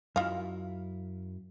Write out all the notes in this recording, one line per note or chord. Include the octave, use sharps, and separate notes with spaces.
F#2 E4 F4 D#5 F5